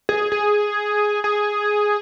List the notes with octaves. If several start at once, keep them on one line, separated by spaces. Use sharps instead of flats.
G#4
G#4
G#4